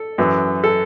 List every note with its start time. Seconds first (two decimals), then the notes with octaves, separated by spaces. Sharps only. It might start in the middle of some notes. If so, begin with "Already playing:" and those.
Already playing: A4
0.18 F#2 E3
0.64 A4